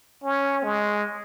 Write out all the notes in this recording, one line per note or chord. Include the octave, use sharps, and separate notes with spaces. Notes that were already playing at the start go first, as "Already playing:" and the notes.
C#4
G#3